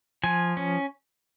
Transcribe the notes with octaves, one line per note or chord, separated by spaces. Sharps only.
F3 G#5
C#4